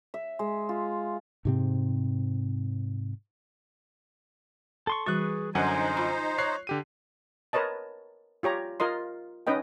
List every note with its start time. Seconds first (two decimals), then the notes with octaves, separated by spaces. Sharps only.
0.14 E5
0.39 G#3
0.69 F4
1.45 G#2 C3 C4
4.87 A4 C6 C#6
5.06 E3 G3 F#4 G#4 B4 C#6 F#6 A6
5.55 F#2 D3 D#4 C5 F#5 G#5
5.97 F4 B5 C6
6.38 C#5 F#6 C7
6.67 D3 G4 D#7
7.53 A#4 B4 C#5 D#5 A5
8.43 F4 G4 C#5 A#5
8.80 F4 A#4 D#5 C6
9.47 C#4 D#4 B4 D#5 G5